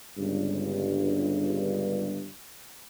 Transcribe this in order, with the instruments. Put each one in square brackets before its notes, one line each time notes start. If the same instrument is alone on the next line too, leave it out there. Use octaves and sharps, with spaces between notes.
[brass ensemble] G1 C#2 G2